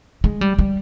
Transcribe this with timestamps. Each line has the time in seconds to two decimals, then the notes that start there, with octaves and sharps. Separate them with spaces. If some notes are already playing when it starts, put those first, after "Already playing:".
0.24 G#3
0.41 G3
0.59 G3